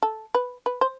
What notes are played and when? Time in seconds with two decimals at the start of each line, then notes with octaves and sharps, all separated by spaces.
0.03 A4
0.35 B4
0.66 B4
0.81 C5